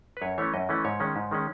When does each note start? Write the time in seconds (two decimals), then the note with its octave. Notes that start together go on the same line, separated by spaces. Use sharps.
0.17 B4
0.22 F#2 C#5
0.38 E3 A3 C#4 C#5
0.53 F#2 D#5
0.69 E3 A3 C#4
0.85 G#2 C#5
1.00 D#3 G#3 C#4
1.16 G#2
1.31 D#3 G#3 C#4